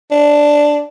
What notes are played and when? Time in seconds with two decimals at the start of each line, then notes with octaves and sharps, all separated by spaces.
0.11 D4